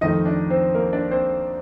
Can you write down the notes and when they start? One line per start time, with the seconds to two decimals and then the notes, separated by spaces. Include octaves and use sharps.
0.01 F2 D#3 A3 D#4 D#5
0.25 D4 D5
0.50 C4 C5
0.75 A#3 A#4
0.93 D4 D5
1.11 C4 C5